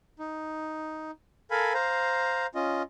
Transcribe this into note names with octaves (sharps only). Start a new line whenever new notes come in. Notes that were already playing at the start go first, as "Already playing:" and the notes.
D#4
A4 A#4 F5 G#5 B5
C5 F5 A#5
C#4 F4 D#5